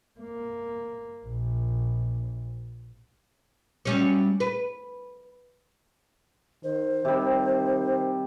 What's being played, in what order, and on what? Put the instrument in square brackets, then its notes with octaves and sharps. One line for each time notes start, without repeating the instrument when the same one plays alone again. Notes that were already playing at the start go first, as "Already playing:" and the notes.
[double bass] A#3
A#1
[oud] F#3 G3 C#4
B4
[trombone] D#3 [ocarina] C5
[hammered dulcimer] C3 G3 [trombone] D#3